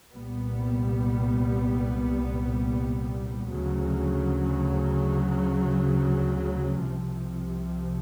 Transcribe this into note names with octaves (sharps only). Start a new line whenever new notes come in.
C2 A#2 G3 B3
D2 C#3 F#3
C2 C3 F3